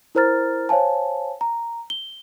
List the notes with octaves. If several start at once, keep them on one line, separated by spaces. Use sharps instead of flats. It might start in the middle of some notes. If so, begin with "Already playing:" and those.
E4 A#4 C5 A#5 F6 A6
C5 C#5 F5 G#5 A5
A#5
G7